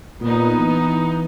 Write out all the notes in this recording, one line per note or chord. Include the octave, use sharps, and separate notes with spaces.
A#2 B3 D#4
E3